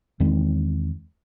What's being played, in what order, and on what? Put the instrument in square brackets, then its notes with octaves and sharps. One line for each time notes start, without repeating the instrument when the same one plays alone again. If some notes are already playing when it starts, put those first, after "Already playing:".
[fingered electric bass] E2 D#3 G#3 C4